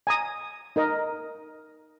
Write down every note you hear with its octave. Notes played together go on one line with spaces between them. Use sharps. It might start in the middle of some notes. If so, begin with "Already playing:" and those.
G#5 A#5 D#6
D#4 A#4 D#5